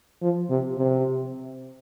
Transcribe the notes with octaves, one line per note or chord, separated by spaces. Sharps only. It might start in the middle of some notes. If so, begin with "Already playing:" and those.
F3
C3
C3